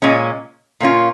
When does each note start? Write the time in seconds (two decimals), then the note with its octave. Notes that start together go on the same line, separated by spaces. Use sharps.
0.02 A#2 G#3 C#4
0.80 A#2 A#3 C#4 F4